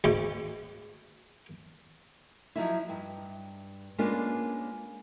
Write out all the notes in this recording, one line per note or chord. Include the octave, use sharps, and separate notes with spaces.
D2 G#2
F3 F#3 D#4 E4
G2
G#3 A#3 C#4 D4 F4 B4